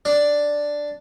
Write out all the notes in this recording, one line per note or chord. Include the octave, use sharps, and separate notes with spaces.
D4